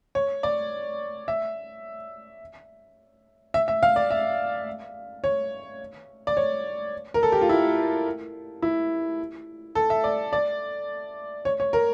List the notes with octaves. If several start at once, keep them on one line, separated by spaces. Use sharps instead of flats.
C#5
D5
E5
E5
E5
F5
D5
E5
C#5
D5
C#5
A#4
A4
G4
F4
E4
E4
A4
E5
D5
D5
C#5
C#5
A#4